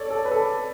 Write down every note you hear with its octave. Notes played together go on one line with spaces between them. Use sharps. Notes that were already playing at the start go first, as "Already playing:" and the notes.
Already playing: A4 C#5 D5
A4
B4
A4